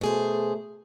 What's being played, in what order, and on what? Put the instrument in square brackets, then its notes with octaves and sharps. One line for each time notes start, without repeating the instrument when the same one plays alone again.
[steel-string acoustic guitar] B2 G#4 C5 [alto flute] A3